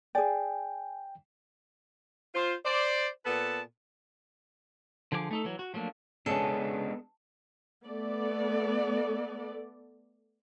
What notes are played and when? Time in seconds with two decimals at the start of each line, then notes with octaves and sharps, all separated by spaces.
0.15 G#4 D5 G5 G#5
2.35 F4 C5
2.65 C5 D5
3.26 A#2 B3 A4 B4 A5
5.12 D3 F3 G#4 F5 D6
5.31 A3 D#4 A4
5.45 E3 F#3
5.59 F#4
5.74 F3 F#3 A3 A#3 D4
6.26 C#3 G#3 B3 C#4 D4 A4
7.85 A3 B3 A4 D5